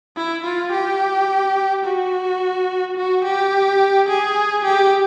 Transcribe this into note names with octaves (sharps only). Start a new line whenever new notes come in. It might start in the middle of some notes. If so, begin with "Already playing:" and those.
E4
F4
G4
F#4
F#4
G4
G#4
G4